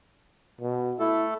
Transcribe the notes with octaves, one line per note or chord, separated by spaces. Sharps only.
B2
A3 E4 A4